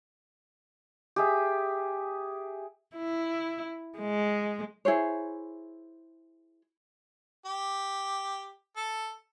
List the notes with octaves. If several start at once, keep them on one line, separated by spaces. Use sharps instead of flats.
G4 G#4 E5
E4
G#3
E4 G#4 C5 C#5
G4
A4